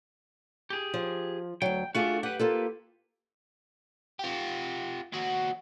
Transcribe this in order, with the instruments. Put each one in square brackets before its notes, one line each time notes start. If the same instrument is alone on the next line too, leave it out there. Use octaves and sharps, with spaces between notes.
[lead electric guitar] G4 G#4
[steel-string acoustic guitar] F3
[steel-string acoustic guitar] D2 F#3 [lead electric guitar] G5
[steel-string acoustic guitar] A3 F4 G#4 [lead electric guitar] D4 F#4
[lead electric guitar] G4 B4 [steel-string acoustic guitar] F#5
[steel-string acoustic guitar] A#3 F4 A4
[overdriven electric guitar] F4 G4
D#2 F#4